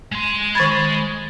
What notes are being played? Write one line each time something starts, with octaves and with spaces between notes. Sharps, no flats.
G#3 C6
D#3 B5 G#6 A6